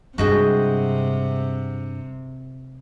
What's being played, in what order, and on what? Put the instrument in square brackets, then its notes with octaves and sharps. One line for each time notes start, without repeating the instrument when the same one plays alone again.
[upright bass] G2 [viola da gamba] C3 [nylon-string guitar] G#3 G#4 [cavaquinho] F#4 D#5 G5